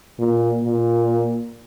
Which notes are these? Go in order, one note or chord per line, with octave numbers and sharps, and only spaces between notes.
A#2
A#2